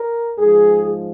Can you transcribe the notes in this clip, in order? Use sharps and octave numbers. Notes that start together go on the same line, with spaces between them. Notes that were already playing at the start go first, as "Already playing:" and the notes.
Already playing: A#4
G#2 F3 G#3 G#4